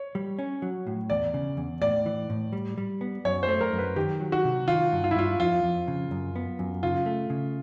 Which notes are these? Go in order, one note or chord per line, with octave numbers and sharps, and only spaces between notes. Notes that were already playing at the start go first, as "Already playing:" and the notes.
Already playing: C#5
G3
C#4
F#3
A2
E2 D5
C#3
E2
A2 D5
E3
A2
G3
G3
B3
F#2 C#5
C5
A3
A#4
F#2
B4
D#3 G4
F#3
F#4
C3
D#3 F4
G2
F4
E4
G2 F4
F2 F4
F2
C#3
F#2
B3
F#2
C#3 F4
A3
C#3